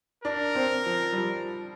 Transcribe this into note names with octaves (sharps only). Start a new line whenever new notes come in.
D4 A#4
C4
F3
G3
F3